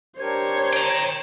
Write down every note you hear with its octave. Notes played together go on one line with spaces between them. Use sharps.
D4 G4 A#4 C5 C#5 G#6
G5 A#5